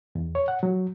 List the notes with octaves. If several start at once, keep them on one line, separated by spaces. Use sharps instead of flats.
E2
C#5
F#5
F#3